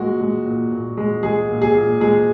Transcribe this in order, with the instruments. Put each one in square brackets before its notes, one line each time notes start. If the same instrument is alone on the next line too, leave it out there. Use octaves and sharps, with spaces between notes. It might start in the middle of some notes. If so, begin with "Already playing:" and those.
Already playing: [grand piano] A#2 G#3 F#4
G#3
A#2
A#2
G#3
G#3 G#4
A#2
G#4
A#2
G#3 G#4